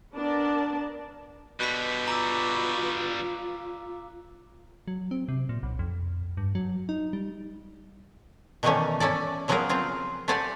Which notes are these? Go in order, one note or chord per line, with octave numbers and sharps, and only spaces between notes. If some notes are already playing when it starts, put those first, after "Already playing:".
B3 D4 A#4 D5 A5
B2 D3 G3 F#6 B6
F4 A#5 D6 E6
F#3
C4
C3
A#2
B1
F2
G2
F#3
D#4
G3
B2 D#3 E3 G3 A3 C#4
C#4 E4 A4 D5
C#3 F3 F#3 B3 G#4 A#4
C4 F4 G#4
A3 G4 C5 D5 F#5 G#5